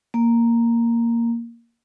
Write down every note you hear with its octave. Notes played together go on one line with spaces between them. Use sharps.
A#3